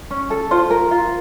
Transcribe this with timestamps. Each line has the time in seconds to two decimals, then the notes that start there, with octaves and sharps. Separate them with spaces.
0.11 C#4
0.30 A4
0.51 F4 C5
0.71 A#4
0.91 F4